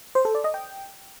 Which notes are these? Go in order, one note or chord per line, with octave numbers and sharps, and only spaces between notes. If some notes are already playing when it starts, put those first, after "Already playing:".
C5
A4
D5
D#5
G5